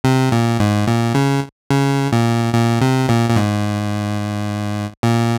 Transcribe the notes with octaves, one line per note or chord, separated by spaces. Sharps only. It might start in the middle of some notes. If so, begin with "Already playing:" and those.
C3
A#2
G#2
A#2
C#3
C#3
A#2
A#2
C3
A#2
A#2
G#2
A#2